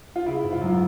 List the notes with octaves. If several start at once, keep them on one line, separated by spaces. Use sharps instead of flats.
F4
C#3 E4
G#1
F4
F#2
F4